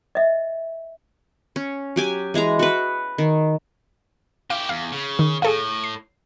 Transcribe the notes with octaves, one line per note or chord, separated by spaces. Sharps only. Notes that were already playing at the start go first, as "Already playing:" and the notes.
D#5 E5
C#4
F#3 G4 G#5
E3 G#3 G#4 A#5
F#4 B4
D#3
E4 G4 F5 D7
E2 F5
C#3
D#3
A2 G#4 A4 F5
C7